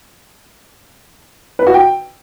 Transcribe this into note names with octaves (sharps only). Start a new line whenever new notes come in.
B4
F#4
G5